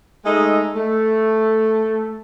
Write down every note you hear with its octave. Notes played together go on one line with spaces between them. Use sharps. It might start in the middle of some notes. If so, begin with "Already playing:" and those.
G#3 A3 D#4 D#5 E5
A3